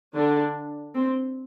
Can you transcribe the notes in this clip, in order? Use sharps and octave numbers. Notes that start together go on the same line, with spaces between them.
D3 D4
C4